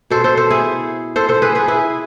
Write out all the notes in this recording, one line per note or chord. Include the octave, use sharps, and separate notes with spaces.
B2 A4 C5
A4 C5
A4 C5
E4 G#4
A4 C5
A4 C5
G#4 B4
G#4 B4
E4 G#4